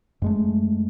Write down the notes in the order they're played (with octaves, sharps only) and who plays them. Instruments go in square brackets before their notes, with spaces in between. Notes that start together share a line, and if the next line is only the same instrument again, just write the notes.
[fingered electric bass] F#2 G#3 A3